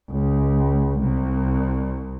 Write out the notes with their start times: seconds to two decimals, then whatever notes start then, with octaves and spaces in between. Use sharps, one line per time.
0.11 C#2
1.00 C2